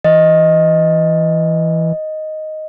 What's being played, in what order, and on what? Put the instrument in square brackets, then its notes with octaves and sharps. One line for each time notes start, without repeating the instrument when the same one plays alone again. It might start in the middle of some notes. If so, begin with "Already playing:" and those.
[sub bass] E3 [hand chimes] D#5